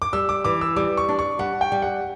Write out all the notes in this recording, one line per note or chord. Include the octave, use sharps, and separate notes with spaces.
D6
G3 E6
D6
E3 D6
E6
G3 D6
C#6
D4
C#6
G3 F#5
G5
G3
F#5